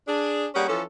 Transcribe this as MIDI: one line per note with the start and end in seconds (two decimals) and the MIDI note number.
0.07 0.47 62
0.07 0.47 68
0.55 0.67 55
0.55 0.67 58
0.55 0.67 61
0.55 0.67 68
0.55 0.67 74
0.55 0.67 78
0.68 0.82 52
0.68 0.82 53
0.68 0.82 61
0.68 0.82 69